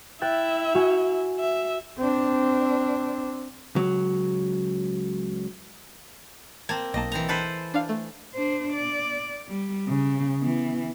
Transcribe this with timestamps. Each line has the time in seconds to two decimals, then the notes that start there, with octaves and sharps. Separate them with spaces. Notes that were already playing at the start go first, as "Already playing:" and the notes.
0.21 E4 E5 G5 F#6 A6
0.75 F#4 G#5
1.40 E5
1.99 C4 D4
3.76 C#2 F#3
6.69 A#3 C4 A5 G#6
6.94 B1 A#3 D#5 A5
7.12 E3 C4 A#5
7.29 A4 B4 C5
7.74 D4 F5
7.89 A3
8.35 D4 C5
8.72 D5
9.48 G3
9.87 C#3
10.40 E3 B3